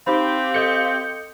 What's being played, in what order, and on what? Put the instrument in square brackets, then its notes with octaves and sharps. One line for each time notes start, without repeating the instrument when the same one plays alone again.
[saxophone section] C4 G4 [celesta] D#4 C5 B5 [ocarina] F5
[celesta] A4 D#5 D#6 [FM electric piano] G6 C#7